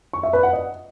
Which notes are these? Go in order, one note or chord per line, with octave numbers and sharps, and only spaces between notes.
C#6
E5
B4
F#5
D#5